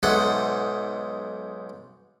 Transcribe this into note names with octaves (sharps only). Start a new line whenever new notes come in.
B1 G#2 G#3 A4 E5 F#5